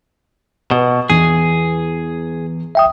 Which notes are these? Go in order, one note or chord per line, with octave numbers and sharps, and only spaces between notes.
B2 F#4 B4
E2 E3 G#4
E5 G5 D#6